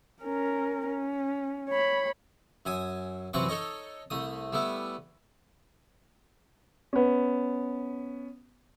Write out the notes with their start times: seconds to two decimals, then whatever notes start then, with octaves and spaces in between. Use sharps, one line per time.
0.23 C#4 A#4
0.87 C#4
1.69 C#5 B5
2.65 F#2 E5 G#5 D#6
3.33 F#2 C3 E3 C4 B4 C#6
3.48 D#4 A4 C#5 D#5
4.10 C2 A3 D#6
4.53 G3 A3 B3 E4
6.93 B3 C#4